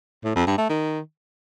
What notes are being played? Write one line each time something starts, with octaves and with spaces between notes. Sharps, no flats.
A2
F2
G2
A3
D#3